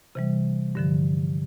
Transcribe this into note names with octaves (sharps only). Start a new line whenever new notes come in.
C3 E3 G3
G2 D3 F3